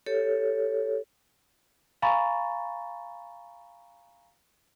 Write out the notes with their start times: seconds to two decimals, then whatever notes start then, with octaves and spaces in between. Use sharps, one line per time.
0.06 G4 A4 C#5
2.02 F5 G#5 A#5 B5 C#6 A6